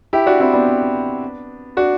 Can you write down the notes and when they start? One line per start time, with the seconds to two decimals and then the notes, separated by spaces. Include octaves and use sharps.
0.13 E4 G4
0.26 D4 F#4
0.40 C4 E4
0.53 B3 D4
1.77 D4 F#4